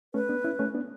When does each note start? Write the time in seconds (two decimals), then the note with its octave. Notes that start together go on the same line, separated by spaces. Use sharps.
0.14 A3 C#4 B4
0.29 B3 D4
0.44 C#4 E4
0.59 A3 C#4
0.74 B3 D4